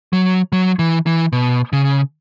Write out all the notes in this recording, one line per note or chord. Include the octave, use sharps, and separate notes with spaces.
F#3
F#3
E3
E3
B2
C#3